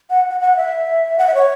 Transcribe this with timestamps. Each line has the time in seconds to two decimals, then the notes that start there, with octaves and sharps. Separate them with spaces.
0.10 F#5
0.30 F#5
0.40 F#5
0.57 E5
1.18 F#5
1.27 E5
1.35 C#5